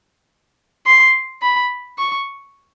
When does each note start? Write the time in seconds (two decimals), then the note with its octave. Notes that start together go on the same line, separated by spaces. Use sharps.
0.86 C6
1.42 B5
1.98 C#6